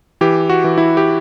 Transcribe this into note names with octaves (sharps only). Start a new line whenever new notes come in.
E3 G4
F#4
E3
E4
G4